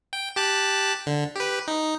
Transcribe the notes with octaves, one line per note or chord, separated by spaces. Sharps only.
G5
G4 A5 F#6
D3
G4 B4
D#4